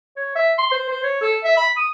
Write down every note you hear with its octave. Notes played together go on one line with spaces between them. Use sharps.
C#5
E5
C6
C5
C5
C#5
A4
E5
B5
D#6